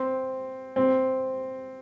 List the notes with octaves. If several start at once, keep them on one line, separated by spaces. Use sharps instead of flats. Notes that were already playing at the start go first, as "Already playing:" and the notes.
Already playing: C4
C4